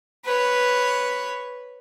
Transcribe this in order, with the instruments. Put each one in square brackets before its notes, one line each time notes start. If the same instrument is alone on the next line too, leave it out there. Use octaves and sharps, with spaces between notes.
[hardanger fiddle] B4 C#5